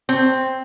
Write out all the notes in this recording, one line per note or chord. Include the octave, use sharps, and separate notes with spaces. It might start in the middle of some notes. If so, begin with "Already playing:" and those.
C4